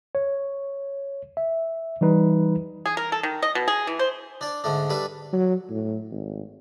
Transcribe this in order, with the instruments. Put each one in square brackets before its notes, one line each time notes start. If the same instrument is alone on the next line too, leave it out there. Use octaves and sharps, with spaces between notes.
[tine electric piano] C#5
E5
E3 G3 D#4 B4
[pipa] G#4
A#4
A4
D#3
D#5
B2
G#4
E3
C5
[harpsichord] D4 D5
G#2 D3 A3 D4
G3 D4 A4 B4
[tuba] F#3
A2
G#1